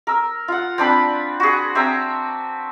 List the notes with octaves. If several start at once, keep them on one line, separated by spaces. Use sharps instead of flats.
A#4 E6
F4 F#5
C4 D4 B4 B5
F#4 G#4
C4 E5 A5 A#5